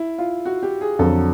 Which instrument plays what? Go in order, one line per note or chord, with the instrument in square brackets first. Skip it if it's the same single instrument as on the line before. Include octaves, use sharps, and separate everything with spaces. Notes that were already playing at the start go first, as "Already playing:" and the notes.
Already playing: [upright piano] E4
F4
F#4
G4
G#4
[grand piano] F2 D3 F#3 [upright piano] A4